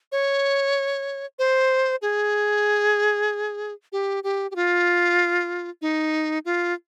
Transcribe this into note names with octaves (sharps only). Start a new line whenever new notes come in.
C#5
C5
G#4
G4
G4
G4
F4
D#4
F4